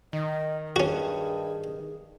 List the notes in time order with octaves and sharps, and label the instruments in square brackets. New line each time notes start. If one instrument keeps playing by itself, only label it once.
[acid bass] D#3 [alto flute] D#5
[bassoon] G2 [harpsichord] C#4 F#4 [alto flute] G#4